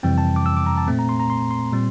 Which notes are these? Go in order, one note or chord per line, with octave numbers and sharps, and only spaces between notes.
F2 C3 E3 G3 C4 G5
A5
D6
E6
D6
A#5
A5
A#2 A3 C4
A#5
C6
A#5
C6
C6
A#2 G3 C4